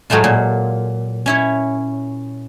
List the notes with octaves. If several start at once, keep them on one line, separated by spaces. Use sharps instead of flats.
A2 F#3 G#3 A3 F4
A#2
C#4 E4 C#5